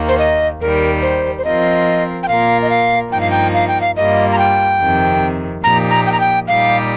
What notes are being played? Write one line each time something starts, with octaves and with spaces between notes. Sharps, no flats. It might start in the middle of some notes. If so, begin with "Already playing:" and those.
Already playing: D#2 D#3 A#3
C5
D#5
D#2 D#3 G3 A#4
C5
C5
F3 C4 F4 A#4 D#5
G5
A#2 A#3 F4 A#4 F5
D#5
F5
G2 F3 A#3 D#4 G5
F5
G5
F5
G5
F5
G2 G3 A#3 F4 D#5
A#5
G5
F2 C3 D#3
A#2 F3 A#3 D#4 G4 A#5
A#5
G5
A#5
G5
A#2 G3 D#4 G4 F5